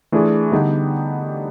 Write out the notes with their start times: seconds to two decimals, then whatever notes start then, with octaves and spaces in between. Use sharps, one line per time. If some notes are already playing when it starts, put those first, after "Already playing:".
0.12 E3 A3 D4 F4 G#4
0.52 D3 G3 B3 D#4 G4